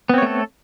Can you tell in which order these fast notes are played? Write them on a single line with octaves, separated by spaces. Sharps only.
B3 C4 C#5 A3 A4